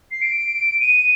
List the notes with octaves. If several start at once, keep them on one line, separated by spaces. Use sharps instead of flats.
C7
D7
D#7